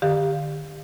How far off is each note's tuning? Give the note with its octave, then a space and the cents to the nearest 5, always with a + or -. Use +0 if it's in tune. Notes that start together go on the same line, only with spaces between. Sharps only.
D3 +40 G4 +20 F5 +0